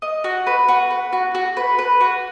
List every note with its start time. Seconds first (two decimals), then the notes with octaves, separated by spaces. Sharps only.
0.02 D#5
0.24 F#4
0.47 B4
0.68 F#4
0.90 B4
1.13 F#4
1.35 F#4
1.57 B4
1.79 B4
2.00 F#4